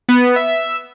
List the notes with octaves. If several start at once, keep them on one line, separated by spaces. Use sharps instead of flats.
B3
E5